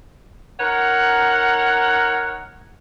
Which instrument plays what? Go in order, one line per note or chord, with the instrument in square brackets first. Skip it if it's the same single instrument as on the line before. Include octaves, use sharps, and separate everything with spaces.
[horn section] D#4 A#4 C#5 F#5